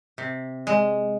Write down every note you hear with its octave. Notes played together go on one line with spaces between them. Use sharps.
C3
G#3